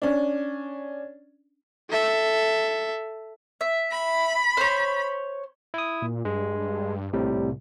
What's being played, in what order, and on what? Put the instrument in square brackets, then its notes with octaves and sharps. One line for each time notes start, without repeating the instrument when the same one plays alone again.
[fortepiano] C#4 D4
[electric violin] A4 E5
[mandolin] E5
[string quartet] B5
[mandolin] C5 C#5
[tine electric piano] E4 D#6
[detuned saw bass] A#2
[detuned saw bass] G2 [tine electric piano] G#3
[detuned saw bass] A#1 [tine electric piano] A2 C3 G3
[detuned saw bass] C2